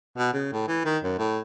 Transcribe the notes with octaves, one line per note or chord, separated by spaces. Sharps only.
B2
C#3
A2
E3
D#3
F#2
A2